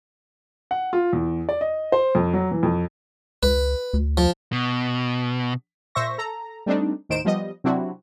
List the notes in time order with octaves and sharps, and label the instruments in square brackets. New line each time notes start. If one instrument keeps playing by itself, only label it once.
[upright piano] F#5
F4
E2
D5
D#5
C5
F2
F#3
E3
F2
[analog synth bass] C#2 [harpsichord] B4
[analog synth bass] D2
[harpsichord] F3
[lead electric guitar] B2
[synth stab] A#2 C5 E5 C#6 A#6
A4 A#5
G3 A3 C4 D4 D#4
D#2 A2 D#3 C5 D7 E7
F3 G3 B3 D#5
C3 F#3 C4 D4 E4 F#4